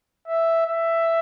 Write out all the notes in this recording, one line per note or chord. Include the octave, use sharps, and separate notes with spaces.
E5
E5